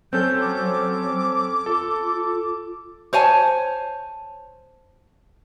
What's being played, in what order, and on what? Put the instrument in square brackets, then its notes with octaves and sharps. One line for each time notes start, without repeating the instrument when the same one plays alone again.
[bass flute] F#3 [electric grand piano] C4 C#4 A4 [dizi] G6
[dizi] D6
[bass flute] F4 [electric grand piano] A4
[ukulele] C5 C#5 G#5 A5